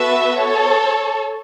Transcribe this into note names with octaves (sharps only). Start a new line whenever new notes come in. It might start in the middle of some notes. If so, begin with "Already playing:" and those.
Already playing: B3 F#4 A4 B4 E5
A4 C#5